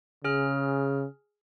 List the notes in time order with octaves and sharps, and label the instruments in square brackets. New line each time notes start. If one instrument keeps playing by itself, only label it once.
[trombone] C#3 [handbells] G#4 F6